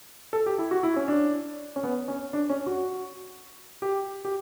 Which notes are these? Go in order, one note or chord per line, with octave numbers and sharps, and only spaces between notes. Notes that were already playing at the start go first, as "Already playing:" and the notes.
A4
G4
E4
F#4
E4
C#4
D4
C#4
B3
C#4
D4
C#4
F#4
G4
G4